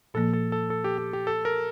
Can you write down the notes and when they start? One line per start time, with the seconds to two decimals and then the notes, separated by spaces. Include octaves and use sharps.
0.14 A#2 F3 A#3 A4
0.33 A4
0.52 A4
0.70 A4
0.84 G4
0.98 G4
1.13 G4
1.27 A4
1.45 A#4